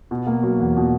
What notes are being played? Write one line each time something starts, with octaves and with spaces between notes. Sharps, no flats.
B2
A#3
F#3
E2
B2